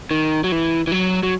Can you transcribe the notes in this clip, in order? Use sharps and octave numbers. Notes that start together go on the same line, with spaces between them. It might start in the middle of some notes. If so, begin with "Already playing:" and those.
D#3
F#3
E3
E3
F#3
F#3